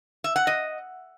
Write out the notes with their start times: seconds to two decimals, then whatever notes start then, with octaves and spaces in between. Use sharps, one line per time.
0.24 E5
0.36 F#5
0.47 D#5